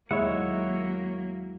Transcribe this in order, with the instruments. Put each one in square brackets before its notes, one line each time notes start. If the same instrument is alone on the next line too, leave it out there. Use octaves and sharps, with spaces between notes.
[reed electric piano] D#2 G#3 E4 [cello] F#3 A#3 [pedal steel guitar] C#5 E5 F#5